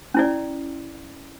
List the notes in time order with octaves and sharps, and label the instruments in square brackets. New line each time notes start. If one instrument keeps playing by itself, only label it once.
[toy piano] C#4 E4 D5